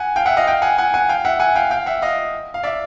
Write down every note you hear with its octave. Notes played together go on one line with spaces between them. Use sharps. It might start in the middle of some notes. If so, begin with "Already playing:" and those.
Already playing: F#5 G#5
F5 G5
E5 F#5
D#5 F5
F5 G5
F#5 G#5
F#5 G#5
F#5 G#5
F5 G5
E5 F#5
F#5 G#5
F5 G5
F5 G5
E5 F#5
D#5 F5
F5
D5 E5